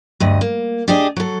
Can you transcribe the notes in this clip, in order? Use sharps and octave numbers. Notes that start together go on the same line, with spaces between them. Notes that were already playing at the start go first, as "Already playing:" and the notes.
D2 G2 D#5
A#3
D4 G4 G#4 D5 D#5
F#3 A4